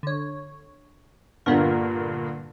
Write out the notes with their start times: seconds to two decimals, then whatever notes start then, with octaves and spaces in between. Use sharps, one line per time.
0.03 D3 C#5
1.46 G2 A#2 D3 A#3 B3 A#4